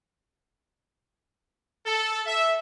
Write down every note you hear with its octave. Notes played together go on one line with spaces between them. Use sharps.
A4
E5